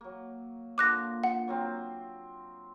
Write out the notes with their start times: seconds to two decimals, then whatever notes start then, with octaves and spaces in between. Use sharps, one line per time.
0.01 F#3 A#3
0.78 A#2 D3 F3 D6 F#6 A#6
1.24 F#5
1.48 F#3 A#3 C4